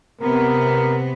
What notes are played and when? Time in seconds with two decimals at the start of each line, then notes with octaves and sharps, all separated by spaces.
0.21 C3 B3 A#4